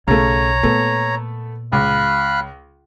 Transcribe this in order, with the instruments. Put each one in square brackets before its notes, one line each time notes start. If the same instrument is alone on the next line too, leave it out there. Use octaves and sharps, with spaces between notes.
[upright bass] B1 [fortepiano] C#3 A3 [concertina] C#5 A#5
[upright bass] A#2 [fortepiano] A3 B3
[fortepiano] C#2 [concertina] F5 B5 F#6